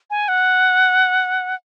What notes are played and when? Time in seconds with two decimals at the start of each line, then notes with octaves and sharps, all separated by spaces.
0.10 G#5
0.28 F#5